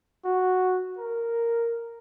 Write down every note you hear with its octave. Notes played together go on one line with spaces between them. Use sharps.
F#4
A#4